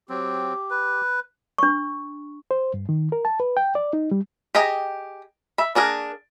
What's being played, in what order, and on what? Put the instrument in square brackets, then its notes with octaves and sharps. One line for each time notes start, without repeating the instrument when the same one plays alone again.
[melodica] F#3 C4 [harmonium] G4
[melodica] B4
[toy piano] D4 C#6
[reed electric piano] C5
G2
D#3
A#4
A5
B4
G5
D5
D#4
G3
[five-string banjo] G4 G#4 D#5 G5 A#5
E5 B5
A#3 D4 G#4 A#4